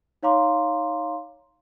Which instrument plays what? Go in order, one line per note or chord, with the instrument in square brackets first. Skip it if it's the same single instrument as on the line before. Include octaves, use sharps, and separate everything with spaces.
[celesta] D#4 C#5 F5 A#5 C6 D6